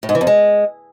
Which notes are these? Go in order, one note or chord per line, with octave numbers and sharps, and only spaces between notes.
A2
G#2
E3
F2
G#3